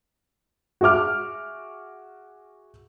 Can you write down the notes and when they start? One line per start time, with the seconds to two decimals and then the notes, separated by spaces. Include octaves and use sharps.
0.81 F#4 G#4 E5 D6 F6